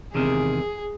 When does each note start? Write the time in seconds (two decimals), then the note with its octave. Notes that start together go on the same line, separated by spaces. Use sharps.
0.14 E2 C3 D#3 G#4